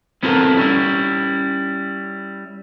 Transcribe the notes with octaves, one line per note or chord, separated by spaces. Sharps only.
B3 C4 E4 F4 A4 A#4
G3 C#4 E4